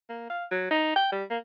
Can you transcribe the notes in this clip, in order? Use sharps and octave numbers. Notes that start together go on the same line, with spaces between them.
A#3
F5
F#3
D#4
G5
G3
A#3